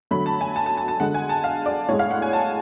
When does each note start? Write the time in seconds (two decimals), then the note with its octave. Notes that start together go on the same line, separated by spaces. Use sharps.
0.11 D3 F#3 A3 B5
0.26 A5
0.41 G#5
0.56 A5
0.66 A5
0.77 A5
0.88 A5
1.00 D3 G#3 F#5
1.14 G#5
1.29 A5
1.44 F5
1.66 D5
1.88 A2 G#3 C#5
1.99 F5
2.11 F#5
2.22 G#5
2.33 A5